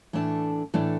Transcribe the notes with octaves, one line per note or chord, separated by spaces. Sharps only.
A2 E3 A3 D4 A5
A2 E3 A3 D4